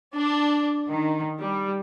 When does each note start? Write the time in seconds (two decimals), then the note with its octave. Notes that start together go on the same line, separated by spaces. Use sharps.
0.15 D4
0.89 D#3
1.41 G3